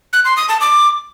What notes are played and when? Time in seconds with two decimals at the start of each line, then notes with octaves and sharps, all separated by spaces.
0.13 F#6
0.25 C6
0.37 D#6
0.49 A5
0.61 D6